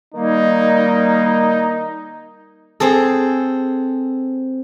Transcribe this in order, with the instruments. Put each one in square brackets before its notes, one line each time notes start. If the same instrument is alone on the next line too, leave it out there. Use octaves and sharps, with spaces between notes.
[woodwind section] D#3 G3 A#3 [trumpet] D#4
[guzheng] C4 G#4 A4